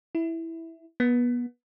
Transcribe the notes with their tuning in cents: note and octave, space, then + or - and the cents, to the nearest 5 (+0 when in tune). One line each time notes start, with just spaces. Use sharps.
E4 -5
B3 -25